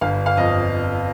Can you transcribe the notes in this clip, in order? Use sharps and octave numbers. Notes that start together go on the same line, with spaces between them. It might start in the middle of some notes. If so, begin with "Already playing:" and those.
G1 F5
F5
F2 D#5